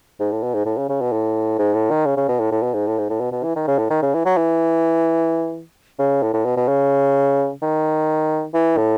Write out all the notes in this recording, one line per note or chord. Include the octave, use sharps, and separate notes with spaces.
G#2
A2
B2
G#2
A2
C#3
C#3
B2
A2
G#2
A2
D#3
C#3
C#3
B2
A2
A2
B2
G#2
A2
G#2
A2
B2
B2
E3
D#3
C#3
A2
D#3
C#3
E3
F#3
E3
C#3
A2
A2
B2
B2
C#3
D#3
E3
A2